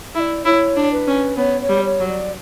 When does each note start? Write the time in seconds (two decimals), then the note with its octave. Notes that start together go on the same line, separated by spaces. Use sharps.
0.15 E4 E5
0.20 D5
0.45 E4 C#5
0.76 D4
0.92 B4
1.07 C#4
1.37 B3 C#5
1.61 C#5
1.69 G3
1.85 C#5
2.00 F#3
2.07 D5